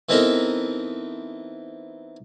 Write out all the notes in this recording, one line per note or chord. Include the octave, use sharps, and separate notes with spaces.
E3 B3 C4 D#4 A4 A#4